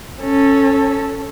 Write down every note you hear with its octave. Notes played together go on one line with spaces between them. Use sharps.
C#4 A4